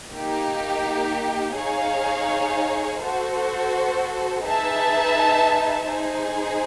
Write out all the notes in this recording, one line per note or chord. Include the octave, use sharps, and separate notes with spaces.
A#3 D#4 G4
D#4 G#4 C#5 F5
F#4 A4 C5
D#4 G#4 B4 E5 A5
D#4 G#4 C5